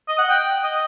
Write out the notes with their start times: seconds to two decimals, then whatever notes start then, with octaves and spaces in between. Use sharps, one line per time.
0.08 D#5
0.18 F#5
0.30 G5
0.63 D#5